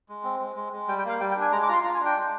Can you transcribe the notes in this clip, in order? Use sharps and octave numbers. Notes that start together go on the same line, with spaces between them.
G#3
C4
G#3
G#3
G#3
G3 G5
G5
A#3 F5
G3 G5
G5
D4
G#5
G#3 A#5
D6
F4 A#5 C6
F4 A#5
G#5
D4
G5
G#3